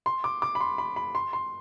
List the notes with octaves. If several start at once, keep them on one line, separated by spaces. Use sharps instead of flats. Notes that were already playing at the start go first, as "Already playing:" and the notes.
C6
D6
D6
B5
C6
B5
B5
C6
C6